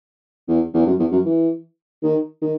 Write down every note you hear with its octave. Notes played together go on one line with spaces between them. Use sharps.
E2
E2
F#2
E2
F#2
E3
D#3
D#3